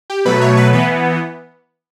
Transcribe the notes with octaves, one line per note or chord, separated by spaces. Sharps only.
G4
B2 F#3 A3 B4
C#5
B4
E3 B3 B4